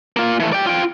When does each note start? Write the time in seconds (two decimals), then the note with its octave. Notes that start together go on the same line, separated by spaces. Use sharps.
0.16 A#3 F4
0.40 E3 A3
0.53 D5 G5
0.67 F4 G5